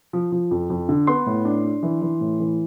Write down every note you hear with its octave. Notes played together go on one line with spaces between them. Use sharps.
F3
F3
F2
F2
D3
B3 C6
A2
D4
D4
E3
E3
A2
E3